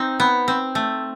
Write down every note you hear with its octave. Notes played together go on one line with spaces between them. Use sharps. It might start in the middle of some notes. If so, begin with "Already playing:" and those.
Already playing: C4 D#4
B3
C4
A3